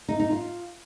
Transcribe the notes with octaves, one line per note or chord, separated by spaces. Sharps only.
D#4
D#4
F4